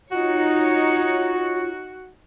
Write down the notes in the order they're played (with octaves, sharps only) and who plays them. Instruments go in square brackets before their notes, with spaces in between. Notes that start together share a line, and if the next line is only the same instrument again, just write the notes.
[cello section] D#4 C#5 [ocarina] F4 [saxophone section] F#4